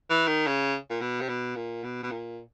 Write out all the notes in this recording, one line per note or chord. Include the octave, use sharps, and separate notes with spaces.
E3
D#3
C#3
A#2
B2
C3
B2
A#2
B2
B2
A#2